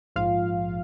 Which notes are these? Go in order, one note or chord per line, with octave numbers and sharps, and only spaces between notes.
A#1 G#2 F3 F4 F5